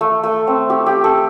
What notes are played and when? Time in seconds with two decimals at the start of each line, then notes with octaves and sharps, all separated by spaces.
0.01 A3
0.23 A3
0.47 C4
0.70 G4
0.86 G4
1.04 A4